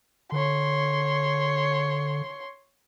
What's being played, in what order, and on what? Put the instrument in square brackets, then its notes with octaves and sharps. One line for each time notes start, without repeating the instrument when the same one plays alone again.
[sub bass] D3 [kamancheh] C#5 C6